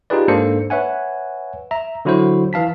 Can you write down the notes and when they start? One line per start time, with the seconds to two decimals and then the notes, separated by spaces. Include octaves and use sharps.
0.10 D#4 F4 G4 G#4 B4 D5
0.28 G#2 A#3 D4 A4 C5 C#7
0.70 B4 C#5 E5 F#5 G#5
1.71 E5 A#5
2.05 D3 F#3 E4 F#4 C5
2.53 E3 F5 A5 B6